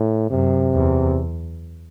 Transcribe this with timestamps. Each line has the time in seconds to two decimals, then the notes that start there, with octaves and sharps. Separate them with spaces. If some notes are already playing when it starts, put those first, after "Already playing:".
Already playing: A2
0.29 F#2 C3
0.74 E2